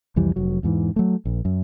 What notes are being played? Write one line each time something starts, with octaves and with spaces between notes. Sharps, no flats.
C2 F2 E3 G3
F1 F#3
E2 G#2 E3
F#3 A3
A#1
F#2